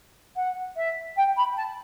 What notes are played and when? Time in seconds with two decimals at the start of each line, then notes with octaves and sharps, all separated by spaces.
0.36 F#5
0.76 E5
1.17 G5
1.37 B5
1.57 A5